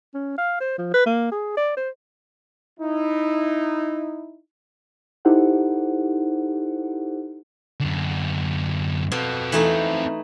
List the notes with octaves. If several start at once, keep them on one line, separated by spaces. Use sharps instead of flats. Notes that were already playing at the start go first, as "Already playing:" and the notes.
C#4
F5
C5
F3
B4
A#3
G#4
D5
C5
D#4 E4
D#4 E4 G4 A4 C5 F#5
F#2 D3
B2 C4 A4
E3 A3 D#4